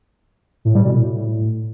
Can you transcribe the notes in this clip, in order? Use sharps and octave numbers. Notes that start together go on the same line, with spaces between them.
A2
G3
B2
A2
A2